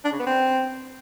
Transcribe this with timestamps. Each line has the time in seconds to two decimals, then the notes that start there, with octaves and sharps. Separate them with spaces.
0.05 D4
0.12 C#3
0.19 B3
0.27 C4